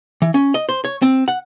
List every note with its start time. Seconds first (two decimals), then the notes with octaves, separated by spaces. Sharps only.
0.22 E3
0.34 C#4
0.54 D#5
0.69 C5
0.85 C#5
1.02 C4
1.28 F#5